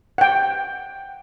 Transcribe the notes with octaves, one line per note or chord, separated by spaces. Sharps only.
F#5 G5